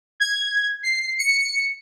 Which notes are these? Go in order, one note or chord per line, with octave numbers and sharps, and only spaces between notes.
G#6
C7
C#7